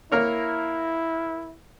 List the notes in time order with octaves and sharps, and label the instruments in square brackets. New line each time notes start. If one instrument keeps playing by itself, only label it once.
[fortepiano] A#3 A#4 C#5 [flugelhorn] E4